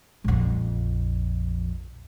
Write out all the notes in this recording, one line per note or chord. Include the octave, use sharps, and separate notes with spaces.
A#1 F2